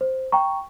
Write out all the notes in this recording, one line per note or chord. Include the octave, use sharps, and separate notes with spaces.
C5
G5 A#5 C#6